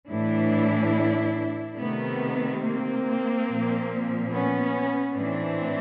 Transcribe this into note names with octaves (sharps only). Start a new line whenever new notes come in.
A2 E3 D4 E4
C3 D#3 A3 B3
A#3 C4
A#2 F3
B3 C#4
A2 E3 C4 D4